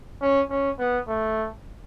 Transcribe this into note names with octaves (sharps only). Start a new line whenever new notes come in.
C#4
C#4
B3
A3